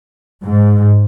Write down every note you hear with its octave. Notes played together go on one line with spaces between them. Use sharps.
G#2